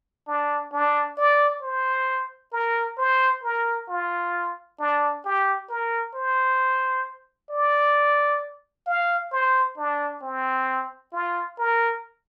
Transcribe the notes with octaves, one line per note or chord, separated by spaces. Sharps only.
D4
D4
D5
C5
A#4
C5
A#4
F4
D4
G4
A#4
C5
D5
F5
C5
D4
C4
F4
A#4